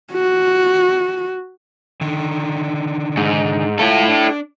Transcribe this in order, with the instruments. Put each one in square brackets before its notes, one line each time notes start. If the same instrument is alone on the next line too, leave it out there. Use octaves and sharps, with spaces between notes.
[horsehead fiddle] F#4
[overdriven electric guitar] D3 D#3
[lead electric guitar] G#2
[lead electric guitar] E4 A4 [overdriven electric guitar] F4 C#5
[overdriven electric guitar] D4